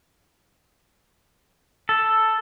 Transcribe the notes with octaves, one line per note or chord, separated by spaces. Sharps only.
A4